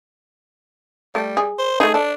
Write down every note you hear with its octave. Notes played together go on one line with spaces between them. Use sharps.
G3 A3
G#4
C5
A3 D#4 G#4
D4 A4